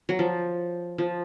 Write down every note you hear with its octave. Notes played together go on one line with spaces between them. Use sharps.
F#3
F3
F3